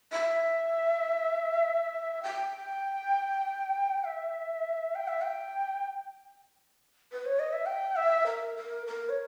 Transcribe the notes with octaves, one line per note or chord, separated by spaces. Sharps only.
E5
G5
E5
G5
E5
G5
B4
C#5
D#5
E5
G5
E5
A#4
A#4
A#4
C#5